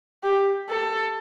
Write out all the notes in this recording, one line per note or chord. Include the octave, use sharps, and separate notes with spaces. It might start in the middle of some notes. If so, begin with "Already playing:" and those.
G4
A4